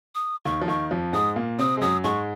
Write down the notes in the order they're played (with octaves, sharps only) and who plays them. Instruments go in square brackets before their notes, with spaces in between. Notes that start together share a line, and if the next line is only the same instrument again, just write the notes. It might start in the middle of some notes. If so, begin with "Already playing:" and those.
[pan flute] D#6
[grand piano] D#2 D#3 [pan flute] C#6
[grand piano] F3
[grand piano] D#2 D#3 [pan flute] C#6
[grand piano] F2 F3
[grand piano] G#2 G#3 [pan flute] D#6
[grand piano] A#2 A#3
[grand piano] C3 C4 [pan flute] D#6
[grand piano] G#3
[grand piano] F#2 F#3 [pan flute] D#6
[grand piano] G#2 G#3 [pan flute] C#6